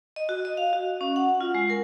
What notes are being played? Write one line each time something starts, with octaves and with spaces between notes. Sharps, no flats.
D#5
F#4
D#5
F5
F#4
C#4
F#5
F4
G#3
A#4